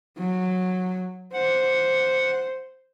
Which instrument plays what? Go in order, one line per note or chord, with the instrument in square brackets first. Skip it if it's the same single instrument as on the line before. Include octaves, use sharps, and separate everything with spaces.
[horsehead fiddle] F#3
[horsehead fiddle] C5 [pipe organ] F#5